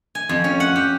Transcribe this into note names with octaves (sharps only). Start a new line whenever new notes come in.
G#5
F2
C#4
F#5
G4